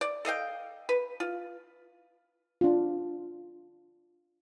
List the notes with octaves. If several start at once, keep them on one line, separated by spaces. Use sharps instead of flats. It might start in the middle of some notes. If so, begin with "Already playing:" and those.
D5
A4 D#5 F5 G5
B4
F4
D4 F4